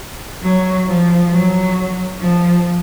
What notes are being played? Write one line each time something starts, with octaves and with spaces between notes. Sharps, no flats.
F#3
F3
F#3
F3